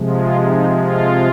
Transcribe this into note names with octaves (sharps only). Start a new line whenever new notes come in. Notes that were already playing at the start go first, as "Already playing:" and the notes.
Already playing: C3 F3 G#3
F4
D#4
F4